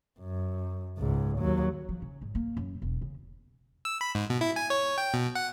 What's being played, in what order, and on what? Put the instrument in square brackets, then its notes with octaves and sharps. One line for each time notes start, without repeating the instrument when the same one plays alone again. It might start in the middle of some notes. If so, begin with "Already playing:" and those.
[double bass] F#2
C#2 G#2
D#2 F#3
[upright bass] F3
C#3
G#2
A#3
F#2
E1
C#3
[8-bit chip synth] E6
B5
G#2
B2
E4
G#5
C#5
G5
B2
F#5